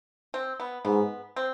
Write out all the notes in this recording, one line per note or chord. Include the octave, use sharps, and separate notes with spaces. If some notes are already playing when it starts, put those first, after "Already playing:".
C4
B3
G#2 B3
C4